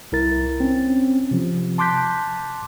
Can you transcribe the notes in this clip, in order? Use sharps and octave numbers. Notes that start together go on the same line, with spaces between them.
C2 E4 A#4 A6
C4 C#4
C3 F3
A5 C6 D6 F#6 G6 B6